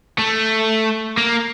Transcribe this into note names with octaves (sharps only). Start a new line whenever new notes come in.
A3
A#3